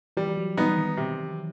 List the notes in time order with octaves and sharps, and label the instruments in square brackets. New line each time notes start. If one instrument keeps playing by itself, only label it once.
[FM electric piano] E3 [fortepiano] G3
[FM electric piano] E3
F#3
[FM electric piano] G3 [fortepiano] B3 D#4
[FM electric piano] D#3
[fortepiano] C3